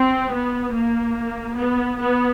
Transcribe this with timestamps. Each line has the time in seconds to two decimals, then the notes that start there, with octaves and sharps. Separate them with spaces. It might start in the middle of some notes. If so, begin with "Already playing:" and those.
Already playing: C4
0.32 B3
0.74 A#3
1.57 B3
1.99 B3